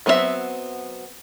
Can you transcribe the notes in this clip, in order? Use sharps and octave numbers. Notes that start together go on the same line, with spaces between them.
F#3 B3 C4 F4 E5